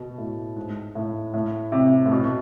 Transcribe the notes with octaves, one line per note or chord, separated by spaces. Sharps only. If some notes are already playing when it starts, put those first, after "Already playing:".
Already playing: B2
A2
G#2
A2
A2
C3
A2
B2